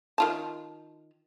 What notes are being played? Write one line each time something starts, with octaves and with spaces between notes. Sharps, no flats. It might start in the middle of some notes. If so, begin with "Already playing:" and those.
D#3 F4 A5